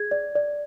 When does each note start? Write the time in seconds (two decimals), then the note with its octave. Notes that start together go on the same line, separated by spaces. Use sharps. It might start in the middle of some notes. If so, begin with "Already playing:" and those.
Already playing: G#4 G#6
0.11 D5
0.35 D5